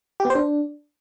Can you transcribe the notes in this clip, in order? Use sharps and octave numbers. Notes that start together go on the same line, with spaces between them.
G4
B3
C5
D4